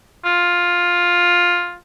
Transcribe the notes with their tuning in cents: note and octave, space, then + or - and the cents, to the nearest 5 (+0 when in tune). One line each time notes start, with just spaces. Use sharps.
F4 +10